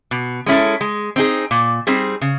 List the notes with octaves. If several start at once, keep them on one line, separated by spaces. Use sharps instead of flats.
B2
G#3 C#4 E4 A4
G#3
C4 D#4 G#4
A#2
G3 C4 D#4 G#4
C#3